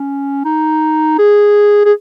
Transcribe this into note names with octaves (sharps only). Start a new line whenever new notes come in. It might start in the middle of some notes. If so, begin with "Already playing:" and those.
Already playing: C#4
D#4
G#4
G#4